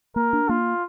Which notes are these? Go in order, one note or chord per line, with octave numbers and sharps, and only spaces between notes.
A#3 A#4
D4
A#3 F4